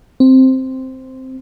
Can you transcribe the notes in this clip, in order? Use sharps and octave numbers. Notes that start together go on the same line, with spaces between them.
C4